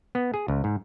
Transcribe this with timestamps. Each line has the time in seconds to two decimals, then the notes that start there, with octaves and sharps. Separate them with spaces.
0.15 B3
0.34 G#4
0.48 C#2
0.64 G#2